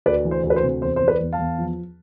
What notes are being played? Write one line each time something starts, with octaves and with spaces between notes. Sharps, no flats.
D2 B4 D5
E3
C5
D2
B4
C5
C3
E2 C5
C5
E3
B4 D5
E2
F5 A5
E2
F3